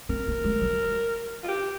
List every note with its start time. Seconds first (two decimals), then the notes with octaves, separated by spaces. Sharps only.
0.09 C4 A#4
0.27 A#3
0.44 G#3
0.61 G3
1.43 F4
1.48 G4